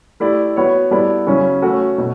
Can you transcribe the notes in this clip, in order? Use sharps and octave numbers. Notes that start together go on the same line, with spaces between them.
A3 E4 G4 D5
B3 F#4 C#5
G3 B3 E4 A4 D5
C#3 F#3 C#4
A3 C#4 F#4 A4
B2